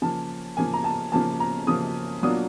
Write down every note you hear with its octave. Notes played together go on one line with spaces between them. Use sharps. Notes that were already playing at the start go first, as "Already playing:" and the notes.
C#3 F3 A#3 A5
C#3 F3 A#3 G#5
A#5
A5
C#3 F3 A#3 A5
A#5
C#3 F3 A#3 D#6
B2 F#3 A#3 D4 F4 D#6